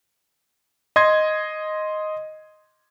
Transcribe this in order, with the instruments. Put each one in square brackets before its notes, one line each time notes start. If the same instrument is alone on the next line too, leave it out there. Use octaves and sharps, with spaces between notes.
[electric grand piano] D#5 C6 G#6